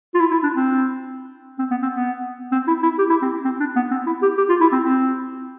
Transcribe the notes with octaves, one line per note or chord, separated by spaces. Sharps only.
F4
E4
E4
D4
C4
C4
B3
C4
B3
C4
E4
E4
G4
E4
C4
C4
D4
B3
C4
E4
G4
G4
F4
E4
C4
C4